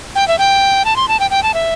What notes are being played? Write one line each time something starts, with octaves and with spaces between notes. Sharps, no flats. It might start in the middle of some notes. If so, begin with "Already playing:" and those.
G5
E5
G5
A5
C6
A5
G5
G5
A5
E5